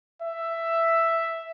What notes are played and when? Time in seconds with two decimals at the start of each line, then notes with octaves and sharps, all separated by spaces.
0.22 E5